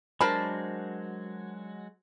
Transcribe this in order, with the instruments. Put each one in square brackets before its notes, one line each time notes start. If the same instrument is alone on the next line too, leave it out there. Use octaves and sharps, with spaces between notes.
[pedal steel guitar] F#3 G#3 F#4 [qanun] D4 C5 A5 [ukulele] A#4 B5